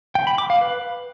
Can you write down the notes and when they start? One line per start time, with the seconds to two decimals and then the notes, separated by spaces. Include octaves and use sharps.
0.15 G5
0.27 B5
0.38 D6
0.50 F5
0.61 B4